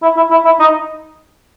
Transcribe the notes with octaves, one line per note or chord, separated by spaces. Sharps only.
E4
E4
E4
E4
D#4